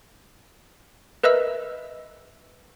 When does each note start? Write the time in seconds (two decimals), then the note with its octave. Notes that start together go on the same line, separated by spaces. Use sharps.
1.23 A#4 B4 D#5 E5 E6 F#6